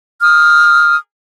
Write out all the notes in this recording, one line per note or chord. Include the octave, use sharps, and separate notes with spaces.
D#6 F6